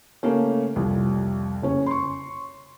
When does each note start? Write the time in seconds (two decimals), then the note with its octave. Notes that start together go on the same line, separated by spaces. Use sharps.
0.23 C#3 A3 A#3 C#4
0.76 C2 F2 G3
1.62 F#1 C#4 C#5
1.86 C6 C#6